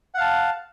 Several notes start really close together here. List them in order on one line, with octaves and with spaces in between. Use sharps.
F#5 F5 A5